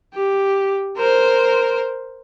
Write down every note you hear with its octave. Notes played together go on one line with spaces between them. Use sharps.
G4
A#4 C5